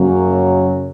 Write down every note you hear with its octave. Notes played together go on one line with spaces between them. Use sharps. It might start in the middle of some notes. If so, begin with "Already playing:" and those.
Already playing: F#2 C#3 F#3 A#3 C#4